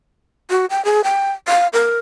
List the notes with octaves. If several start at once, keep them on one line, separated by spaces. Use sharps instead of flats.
F#4
G5
G#4
G5
F5
A#4